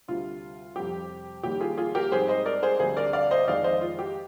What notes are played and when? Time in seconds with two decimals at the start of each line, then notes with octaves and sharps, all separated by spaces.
0.08 D2 C3 G3 F4
0.76 F2 C3 G3 C4 G4
1.43 D#2 D#3 G3 A#3 G4
1.60 F4 G#4
1.77 F4 G#4
1.95 G4 A#4
2.12 G#2 G3 C4 G#4 C5
2.28 C5 D#5
2.46 A#4 D5
2.63 G#4 C5
2.79 D2 D3 G3 C4 G#4 C5
2.96 A#4 D5
3.13 D5 F5
3.31 C5 D#5
3.47 F2 D#3 G#3 D5 F5
3.64 C5 D#5
3.81 F4
3.99 G4